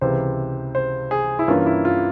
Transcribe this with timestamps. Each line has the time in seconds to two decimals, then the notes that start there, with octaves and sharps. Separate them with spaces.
0.01 C#2 C3 E3 C5
0.75 C5
1.11 G#4
1.39 E4
1.48 G2 E3 A#3 C#4 F4
1.66 E4
1.85 F4